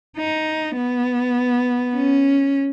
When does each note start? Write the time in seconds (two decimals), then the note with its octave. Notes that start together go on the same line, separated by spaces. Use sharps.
0.17 D#4
0.76 B3
1.95 C#4